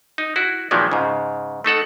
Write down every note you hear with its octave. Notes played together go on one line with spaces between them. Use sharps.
D#4
E4 F#4
A#2 D#3 F3 F#3 G#3 B3
G#2 C#3
A3 D#4 A4 F#5